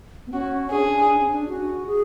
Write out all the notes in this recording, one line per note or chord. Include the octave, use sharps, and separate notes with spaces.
B3
C#4 F#4
D4 G#4
D4
C#4
D4
F#4
G#4